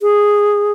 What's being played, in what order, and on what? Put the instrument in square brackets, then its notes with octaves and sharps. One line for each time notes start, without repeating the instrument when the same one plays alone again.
[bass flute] G#4